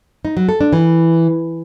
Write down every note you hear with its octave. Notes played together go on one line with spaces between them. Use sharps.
D#4
F#3
A4
D4
E3